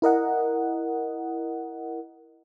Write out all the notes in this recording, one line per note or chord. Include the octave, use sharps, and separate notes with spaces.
E4 A#4 D#5 F#5